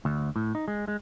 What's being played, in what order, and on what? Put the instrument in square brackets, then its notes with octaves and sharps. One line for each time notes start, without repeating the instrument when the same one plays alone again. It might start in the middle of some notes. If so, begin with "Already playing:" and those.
[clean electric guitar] D2
A2
D#4
G#3
G#3